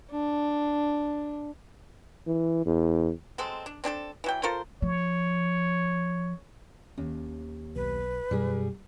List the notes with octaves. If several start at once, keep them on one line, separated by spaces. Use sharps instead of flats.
D4
E3
E2
F#3 G#3 C4 A4
D4
C4 D4 G#4 A4
E3 F#3 G5
F4 A4 A#4 C5
F3 C#5
D#2 C#4
B1 B4
F#2 B2 G3 G#4